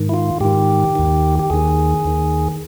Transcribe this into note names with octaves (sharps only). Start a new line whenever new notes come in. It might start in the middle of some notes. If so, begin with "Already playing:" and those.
Already playing: G#2 D#3
E4
F4
G#2 D#3 G4
D#2 D#3
G4
D#2 D#3 G#4
D#2 D#3